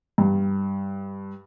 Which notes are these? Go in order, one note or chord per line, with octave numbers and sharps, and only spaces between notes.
G2